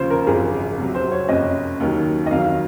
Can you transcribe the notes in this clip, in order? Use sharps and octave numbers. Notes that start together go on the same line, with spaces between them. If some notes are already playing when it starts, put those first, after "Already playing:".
Already playing: D#2 C#3 F3 C5 F5
A#4
G#1 F#2 F3 G#4
C2 C3 F#3
C5
C#5
F#1 F2 C3 D#5
D#2 D#3 F#3
D#5
F2 D#3 F#3 F5